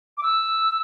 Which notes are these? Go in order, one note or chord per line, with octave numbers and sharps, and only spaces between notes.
D6
E6